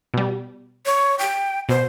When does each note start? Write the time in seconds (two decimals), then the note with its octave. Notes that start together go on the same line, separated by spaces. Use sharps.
0.14 B2 G3
0.86 C#5
1.19 G5
1.69 B2 C5